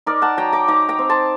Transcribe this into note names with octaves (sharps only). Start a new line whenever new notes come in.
D#4 A#4 D5
F#5 A5
F#3 G5 A#5
A#5 D6
D#4 A#5 D6
G5 A#5
C4
A5 C6